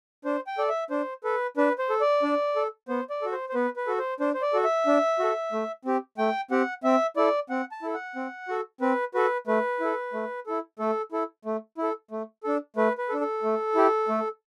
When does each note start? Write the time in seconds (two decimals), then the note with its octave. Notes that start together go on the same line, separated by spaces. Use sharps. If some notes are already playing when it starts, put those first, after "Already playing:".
0.25 D4 C5
0.47 G5
0.58 A4 D5
0.69 E5
0.90 D4 C5
1.24 A4 B4
1.57 D4 B4
1.79 C5
1.90 A4
2.01 D5
2.23 D4
2.56 A4
2.88 B3 C5
3.10 D5
3.22 F#4 A4
3.32 C5
3.49 C5
3.54 B3 B4
3.76 B4
3.87 F#4 A4
3.99 C5
4.20 D4 C5
4.34 C5
4.42 D5
4.53 F#4 A4
4.64 E5
4.87 D4
5.19 F#4 A4
5.52 A3
5.85 C4 G4
6.18 A3 G5
6.51 C4 G4 F#5
6.84 C4 E5
7.17 E4 A4 D5
7.49 C4 F#5
7.72 A5
7.82 E4 A4
7.94 F#5
8.16 C4
8.48 F#4 A4
8.81 C4 B4
9.14 F#4 A4 B4
9.47 A3 B4
9.80 E4 A4
10.13 A3
10.47 E4 A4
10.79 A3 A4
11.12 E4 A4
11.45 A3
11.78 E4 A4
12.11 A3
12.44 D4 A4
12.77 A3 B4
12.98 B4
13.09 A4
13.14 D4
13.21 A4
13.43 A3
13.75 E4 G4
14.08 A3